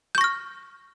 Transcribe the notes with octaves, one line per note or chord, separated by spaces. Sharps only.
C#6 F6 G6 A#6